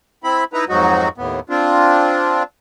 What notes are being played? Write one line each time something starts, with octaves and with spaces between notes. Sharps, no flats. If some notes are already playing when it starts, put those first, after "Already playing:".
C4 E4 B5
D#4 E4 B4 A#5
F2 G#2 F#3 D#4 F#4
D#2 A2 B3
C4 D4 F4